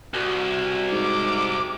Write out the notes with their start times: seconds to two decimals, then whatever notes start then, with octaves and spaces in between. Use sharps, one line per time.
0.14 C2 F#4
0.92 G#2 D6